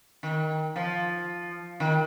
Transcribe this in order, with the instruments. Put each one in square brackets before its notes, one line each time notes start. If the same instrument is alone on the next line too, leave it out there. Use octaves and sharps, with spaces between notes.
[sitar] D#3
F3
D#3